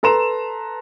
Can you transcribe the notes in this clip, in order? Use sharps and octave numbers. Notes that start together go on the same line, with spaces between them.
A4 B4 A#5 C6 E7